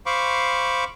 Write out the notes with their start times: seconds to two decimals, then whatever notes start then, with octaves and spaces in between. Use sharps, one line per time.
0.06 C5 F5 B5 C#6 D6